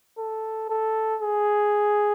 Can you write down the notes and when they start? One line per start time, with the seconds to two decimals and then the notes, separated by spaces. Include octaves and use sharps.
0.18 A4
0.70 A4
1.22 G#4